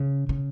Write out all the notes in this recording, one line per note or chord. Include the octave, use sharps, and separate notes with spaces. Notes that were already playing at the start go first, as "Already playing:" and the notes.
Already playing: C#3
C#3